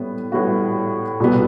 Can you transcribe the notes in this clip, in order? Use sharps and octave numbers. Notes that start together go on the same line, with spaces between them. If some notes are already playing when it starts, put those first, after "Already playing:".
Already playing: A2 G3 B3
A2 G3 B3 F#4
C2 B2 G3 B3